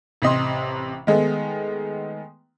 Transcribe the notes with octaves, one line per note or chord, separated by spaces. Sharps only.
A1 C3 D#5 C6
D#3 G#3 A3 B3